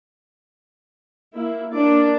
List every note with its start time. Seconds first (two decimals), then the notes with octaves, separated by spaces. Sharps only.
1.35 A#3 E4
1.72 A#3 D4 D5